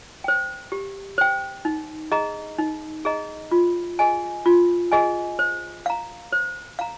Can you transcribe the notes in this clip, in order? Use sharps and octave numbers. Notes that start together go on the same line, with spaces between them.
C5 G5
G4
C5 G5
D#4
G#4 D#5 A#5
D#4
G#4 D#5 A#5
F4
G#4 D#5 G#5
F4
G#4 D#5 G#5
C5
F5 A#5
C5
F5 A#5